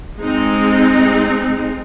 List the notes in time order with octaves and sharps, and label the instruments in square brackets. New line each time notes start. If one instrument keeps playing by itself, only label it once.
[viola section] G#3 C4 D#4